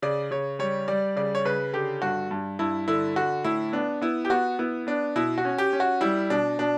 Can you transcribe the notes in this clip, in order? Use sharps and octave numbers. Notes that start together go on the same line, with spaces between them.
C#3 D5
C#3 C#5
G3 C#5
G3 D5
C#3 D5
C#5
C#3 B4
D3 G4
G2 F#4
G2
G2 E4
D3 E4
D3 F#4
A2 E4
B3 D4
B3 E4
G4
B3 F#4
B3 E4
B3 D4
B2 E4
F#4
C#4
G4
C#4
F#4
G3 E4
B2 D4
B2 D4